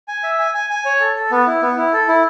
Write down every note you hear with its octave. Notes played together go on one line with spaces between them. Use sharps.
G#5
E5
G#5
G#5
G#5
C#5
A4
A4
B3
E4
B3
E4
A4
E4